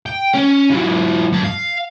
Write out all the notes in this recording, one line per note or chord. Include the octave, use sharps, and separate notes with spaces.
G5
C#4
E3 F#3
F#2 A5
F5